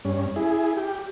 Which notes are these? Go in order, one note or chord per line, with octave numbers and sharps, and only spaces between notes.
G2 C#4
E4 G#4
G4